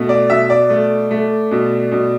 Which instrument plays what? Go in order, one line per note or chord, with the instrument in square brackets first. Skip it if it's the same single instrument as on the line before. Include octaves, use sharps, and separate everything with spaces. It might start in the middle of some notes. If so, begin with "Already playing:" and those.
Already playing: [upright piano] B2 A3
D5
B2 E5
D5
A3
A3
B2
B2